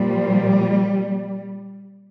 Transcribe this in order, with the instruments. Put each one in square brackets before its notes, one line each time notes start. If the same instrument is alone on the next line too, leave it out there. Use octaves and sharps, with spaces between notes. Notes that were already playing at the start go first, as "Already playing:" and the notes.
Already playing: [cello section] A#2 F3 G3